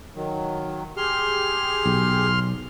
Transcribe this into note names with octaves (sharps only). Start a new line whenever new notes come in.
D#3 F#3
G4 G#4 C6 F6
B1